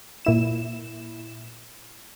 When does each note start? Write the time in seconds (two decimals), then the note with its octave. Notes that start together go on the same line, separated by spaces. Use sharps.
0.25 A#2 E4 E7